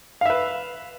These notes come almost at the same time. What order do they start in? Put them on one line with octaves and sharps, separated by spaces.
F5 E5 B4